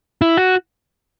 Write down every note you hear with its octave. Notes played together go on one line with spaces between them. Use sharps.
E4
F#4